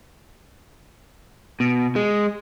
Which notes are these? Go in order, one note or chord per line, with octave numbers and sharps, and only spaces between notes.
B2
G#3